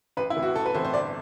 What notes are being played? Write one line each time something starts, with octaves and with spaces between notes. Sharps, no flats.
A1 B4
E4
A2 E3
F#4
A1 A4
B4
A2 E3 C5
C5
G1 D5